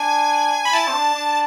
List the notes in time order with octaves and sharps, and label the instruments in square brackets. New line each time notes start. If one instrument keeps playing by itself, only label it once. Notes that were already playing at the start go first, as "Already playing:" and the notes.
Already playing: [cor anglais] D4 [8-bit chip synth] G#5
[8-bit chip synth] B5
[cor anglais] E4 [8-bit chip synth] A5
[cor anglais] C4
D4
D4